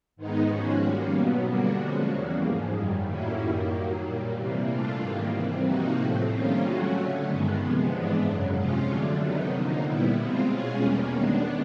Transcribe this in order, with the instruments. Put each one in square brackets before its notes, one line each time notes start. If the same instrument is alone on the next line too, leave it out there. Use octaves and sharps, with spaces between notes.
[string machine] G#2 D#3 G#3 B3 D#4
G#2 F3 G#3 C#4 F#4
D#3 G3 A#3 C#4
B2 F#3 B3
D3 G3 A#3 D4 F#4
F3 G#3 C#4 F#4
E2 C#3 E3 G3 A#3
G#2 F3 G#3
F#2 D#3 G3
A2 F#3 A#3 C#4 E4
F#2 D#3 G3 A#3
D#3 F#3 A#3
A#2 G3 A#3
C3 E3 G3 A#3
E3 A3 D4 F4
G#2 D#3 G3 A#3
C3 E3 G3 C4
C3 F3 A#3 D#4 F#4
A2 F3 A3 C4
D#3 G3 A#3 C#4 F4
C#3 F#3 A3 C#4 F#4
D3 F#3 A3 C#4
G2 D#3 G#3 B3
C3 F3 G#3 B3
G#2 E3 G#3 B3 D4
F#2 C#3 F#3
C3 F3 G#3 C#4 F4
D3 F#3 A3 D4
C3 D#3 F#3 B3 D#4
D3 F3 A#3 D#4
A#2 G3 B3 E4
B2 G#3 C4 F4
B2 G#3 C#4 F4 G#4
E2 B2 G3 A#3 C#4
D#3 G#3 B3 D4